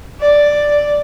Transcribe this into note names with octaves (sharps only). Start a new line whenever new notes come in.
D5